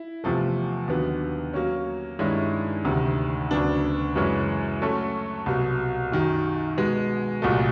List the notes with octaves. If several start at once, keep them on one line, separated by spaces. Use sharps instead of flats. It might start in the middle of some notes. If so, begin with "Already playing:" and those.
Already playing: E4
E2 C3 F3 A3
D#2 D3 F#3 B3
F#3 A#3 C#4
G2 D#3 G#3 C#4 E4
D2 C3 D#3
D2 C#3 F#3 B3 D4
F#2 C#3 E3 G#3 C#4
F#3 A3 C#4 F#4 A4
C2 B2 F#3
F#2 D#3 F#3
B2 G#3 B3
C2 A#2 F#3 A3